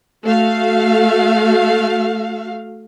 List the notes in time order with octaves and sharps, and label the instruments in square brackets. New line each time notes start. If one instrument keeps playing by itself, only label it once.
[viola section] A3 F#4 F5